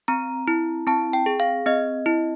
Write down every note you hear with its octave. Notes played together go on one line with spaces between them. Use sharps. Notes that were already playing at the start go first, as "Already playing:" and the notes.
C4 A#5
E4
C4 A5
G5
G#4
F5
C4 D#5
E4